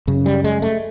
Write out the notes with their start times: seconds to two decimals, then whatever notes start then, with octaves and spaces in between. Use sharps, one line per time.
0.07 F#2 C#3
0.26 G3
0.44 G#3
0.62 A3